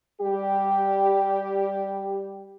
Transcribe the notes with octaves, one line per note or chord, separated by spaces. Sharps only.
G3 G4